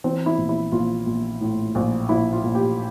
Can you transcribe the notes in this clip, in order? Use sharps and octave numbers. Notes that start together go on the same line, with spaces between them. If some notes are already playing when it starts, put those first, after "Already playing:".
E3 C4
E4
A#1
E4
A#1 F4
A#1
A2
A#1
A#1 E4
F4
A#1
G4